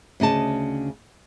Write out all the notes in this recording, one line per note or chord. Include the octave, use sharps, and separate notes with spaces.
D2 C#3 D#5 A5